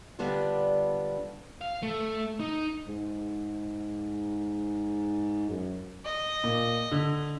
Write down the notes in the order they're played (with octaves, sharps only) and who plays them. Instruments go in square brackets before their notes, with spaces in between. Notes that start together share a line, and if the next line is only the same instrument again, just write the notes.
[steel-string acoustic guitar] D3 G3 B3 D4 F4
[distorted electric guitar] F5
A3
D#4
[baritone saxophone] G#2
F#2
[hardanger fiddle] D#5
[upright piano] A#2
D3